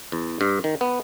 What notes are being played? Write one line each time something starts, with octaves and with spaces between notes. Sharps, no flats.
E2
G2
D#3
B3